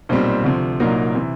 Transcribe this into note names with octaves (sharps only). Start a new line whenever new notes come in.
B1 A#2 G3 C4 C5
D2 C3 F3
C2 A#2 F#3 A#3 D#4
C3 E3